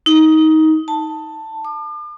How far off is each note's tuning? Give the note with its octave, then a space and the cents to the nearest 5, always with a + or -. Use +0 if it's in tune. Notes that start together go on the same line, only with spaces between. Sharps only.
D#4 +20
A5 +10
D6 +40